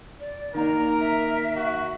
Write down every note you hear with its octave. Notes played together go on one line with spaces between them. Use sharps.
D5
D#3 A#3 D#4 A#4 A#5
E5
F#4